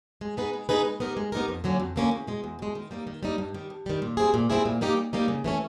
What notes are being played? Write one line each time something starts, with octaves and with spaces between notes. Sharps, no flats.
G#3
B3 D#4 G#4 B4
G#3
B3 D#4 G#4 B4
G#3
B3 D#4 G4 A#4
G#3
B3 D#4 G4 A#4
F2
D3 F#3 A#3 C#4
F2
D3 F#3 A#3 C#4
E2
B2 G#3
E2
B2 G#3
D#3
G3 A#3 D#4
D#3
G3 A#3 D#4
G2
D#3 G3
G2
D#3 G3
A#2
G3 C4 E4 G#4
A#2
G3 C4 E4 G#4
A#2
G3 A#3 D#4 G4
A#2
G3 A#3 D#4 G4
C#3
E3 A3 C#4